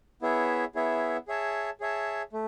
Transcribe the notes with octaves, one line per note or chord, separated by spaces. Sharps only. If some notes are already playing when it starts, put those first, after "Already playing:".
B3 E4 G#4 C#5 E5
B3 E4 G#4 C#5 E5
G#4 C#5 E5 A5
G#4 C#5 E5 A5
A3